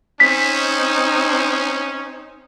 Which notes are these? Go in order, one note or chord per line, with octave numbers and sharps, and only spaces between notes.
C4 C#4 D#4 B6